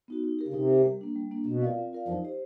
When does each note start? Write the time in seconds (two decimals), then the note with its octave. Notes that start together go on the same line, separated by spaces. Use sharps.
0.08 B3 D#4 F#4
0.24 D#4
0.39 G4 A#4
0.48 C#3
0.54 C3 D#4
0.70 G4 A#4
0.85 G3
1.01 A#3 D4
1.16 G3
1.31 A#3 D4
1.47 B2 C4
1.62 F4 A#4 D5 F5
1.78 C4
1.93 F4 A#4 D5 F5
2.08 F2 F3 D#4
2.24 G4 C5 D#5